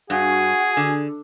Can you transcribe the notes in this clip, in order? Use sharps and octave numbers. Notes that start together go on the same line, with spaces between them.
G2 F#4 G#4 F#5 G#5
D3